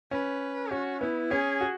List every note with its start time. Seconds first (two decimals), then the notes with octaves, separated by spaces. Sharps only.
0.11 C#4 B4
0.71 C#4 F#4
1.01 B3 E4
1.31 C#4 G#4
1.61 F#4